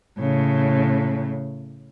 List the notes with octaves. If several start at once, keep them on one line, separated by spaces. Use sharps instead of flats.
A2 C#3